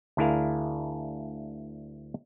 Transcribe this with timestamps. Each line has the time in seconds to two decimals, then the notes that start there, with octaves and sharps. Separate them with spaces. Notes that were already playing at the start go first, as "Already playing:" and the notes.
0.17 D2 D4 E4 G#4 A#4 F5